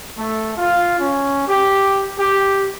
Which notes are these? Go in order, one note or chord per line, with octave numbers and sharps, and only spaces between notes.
A3
F4
C#4
G4
G4